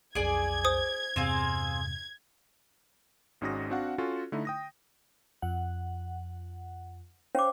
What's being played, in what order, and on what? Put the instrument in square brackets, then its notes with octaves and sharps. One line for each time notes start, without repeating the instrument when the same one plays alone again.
[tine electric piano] B1 F2 [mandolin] G#4 D5 [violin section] G#6
[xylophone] C5 D#6
[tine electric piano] E2 G2 C3 [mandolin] C4 G#4 F5
[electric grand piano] G#1 G#2 C#4 F#4 D#6 A#6
C4 D4 F#4 F5 F#5
C#4 F4 F#4 A4
D3 A3 D#4 E4
G5 D#6 A#6
[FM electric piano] F2 F#5
[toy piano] C#4 D6 [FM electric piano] C5 C#5 F5